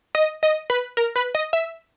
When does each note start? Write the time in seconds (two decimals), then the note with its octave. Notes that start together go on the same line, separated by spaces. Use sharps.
0.15 D#5
0.43 D#5
0.70 B4
0.97 A#4
1.16 B4
1.35 D#5
1.53 E5